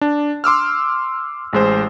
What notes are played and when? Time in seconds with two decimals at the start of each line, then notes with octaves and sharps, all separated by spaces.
0.01 D4
0.44 C6 D6 E6 F6
1.53 A1 G#3 C5